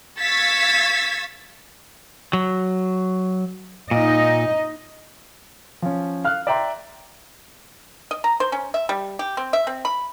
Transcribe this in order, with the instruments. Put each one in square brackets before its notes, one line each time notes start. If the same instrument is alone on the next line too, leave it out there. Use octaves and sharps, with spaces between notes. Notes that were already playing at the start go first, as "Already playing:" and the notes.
[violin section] F5 C#6 E6 G#6 A6 B6
[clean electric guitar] F#3
[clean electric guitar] A#2 [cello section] D#4 D#5
[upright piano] F3 C#4
F5 F6 F#6
D5 E5 G5 A#5 C6
[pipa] D#5
A#5
C5
C#4
E5
G3
G4
C4
E5
C4
B5